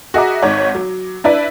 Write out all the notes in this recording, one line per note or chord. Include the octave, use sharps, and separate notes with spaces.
F#4 G#4 D#5 E5 A#5 D6
G#1 D#4 C#5 F#5
F#3
D4 E4 B4 D5